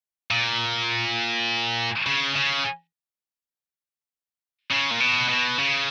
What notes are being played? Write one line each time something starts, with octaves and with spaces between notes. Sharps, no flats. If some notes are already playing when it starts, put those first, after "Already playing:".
A#2
C#3
C#3
C#3
A#2
B2
B2
C#3